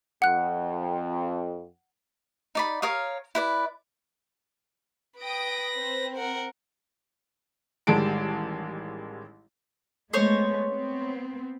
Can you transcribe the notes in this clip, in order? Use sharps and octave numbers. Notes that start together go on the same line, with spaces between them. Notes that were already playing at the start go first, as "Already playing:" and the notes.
F2 F#5 F#6
D#4 D5 B5
A#4 C#5 F5 D#6
E4 B4 D5
B4 G5 D#6 A#6 D7
C4
A#4 F#5
A1 D#3 G3 G#3 A5 D7
G#3 A3 B3 C5 C#5
B3 C4